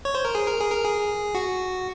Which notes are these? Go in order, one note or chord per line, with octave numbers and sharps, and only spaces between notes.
C#5
C5
A#4
G#4
A#4
G#4
A#4
G#4
F#4